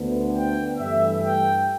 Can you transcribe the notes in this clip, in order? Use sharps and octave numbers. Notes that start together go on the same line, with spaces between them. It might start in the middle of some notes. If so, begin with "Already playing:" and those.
Already playing: D2 D3 B3
G5
G2 E3 A3 E5
G5